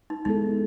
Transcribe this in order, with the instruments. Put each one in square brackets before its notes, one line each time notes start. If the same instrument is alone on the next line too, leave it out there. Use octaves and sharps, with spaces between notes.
[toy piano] D#4
[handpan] G#3 B3 E4 A4 [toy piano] D#4